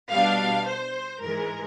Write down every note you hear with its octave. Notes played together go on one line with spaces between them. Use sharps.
B2 G3 B3 D4 F5
C5
G#2 E3 G#3 A#4